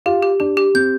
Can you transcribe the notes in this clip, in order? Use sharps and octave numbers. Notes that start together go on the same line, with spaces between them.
F4 G4
G4
D4 G4
G4
C4 G6